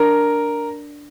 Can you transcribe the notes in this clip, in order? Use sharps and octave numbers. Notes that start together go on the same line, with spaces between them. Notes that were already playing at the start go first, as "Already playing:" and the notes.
Already playing: D4 A#4